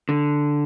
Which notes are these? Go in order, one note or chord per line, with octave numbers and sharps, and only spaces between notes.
D3